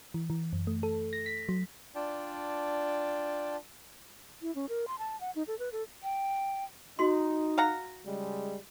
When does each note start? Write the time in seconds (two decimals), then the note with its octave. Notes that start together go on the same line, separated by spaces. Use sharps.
0.14 E3
0.30 E3
0.53 F#2
0.67 A3
0.83 A4
1.13 A#6
1.26 B6
1.49 F#3
1.95 D4 F4 D5 G5 A5
4.42 E4
4.55 C#4
4.69 A#4
4.88 C6
4.99 A5
5.21 F#5
5.36 D#4
5.48 A4
5.59 B4
5.72 A4
6.03 G5
6.99 D#4 F#4 C6
7.58 F5 F#5 A#5
8.06 C#3 G3 G#3